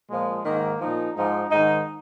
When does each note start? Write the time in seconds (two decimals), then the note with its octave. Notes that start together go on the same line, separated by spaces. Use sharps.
0.10 A#2 F3 G#3
0.45 G#2 D#3 A#3
0.81 A#2 F3 D#4
1.16 G#2 F3 D#4
1.50 G#2 D#3 D#4